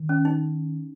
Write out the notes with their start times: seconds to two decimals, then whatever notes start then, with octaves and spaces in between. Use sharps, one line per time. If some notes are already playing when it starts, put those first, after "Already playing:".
Already playing: D#3
0.09 C#4
0.25 D#4